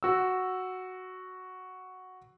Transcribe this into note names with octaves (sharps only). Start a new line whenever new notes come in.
F#4 E6